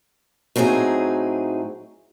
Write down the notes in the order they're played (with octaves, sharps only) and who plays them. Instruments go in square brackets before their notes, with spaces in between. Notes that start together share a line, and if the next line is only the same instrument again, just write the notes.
[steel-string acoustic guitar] A2 F#3 C4 D#4 G#4